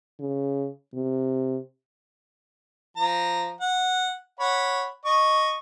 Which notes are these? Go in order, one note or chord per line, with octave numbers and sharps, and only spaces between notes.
C#3
C3
F3 A#5
F#5
C#5 F#5 B5
D#5 C#6